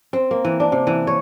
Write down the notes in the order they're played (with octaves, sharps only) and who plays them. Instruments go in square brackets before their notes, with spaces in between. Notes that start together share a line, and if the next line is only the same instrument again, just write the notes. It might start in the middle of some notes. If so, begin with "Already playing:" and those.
[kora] C4
A#3
E3
D4
C3
E3
C#5